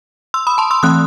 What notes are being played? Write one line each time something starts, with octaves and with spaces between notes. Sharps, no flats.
C6 E6
B5 D#6
A5 C6
C6 E6
E3 A3 C4 D#6 F#6